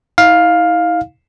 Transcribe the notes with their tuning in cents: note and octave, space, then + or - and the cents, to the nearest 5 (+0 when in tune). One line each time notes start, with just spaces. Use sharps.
E4 -45 F5 +10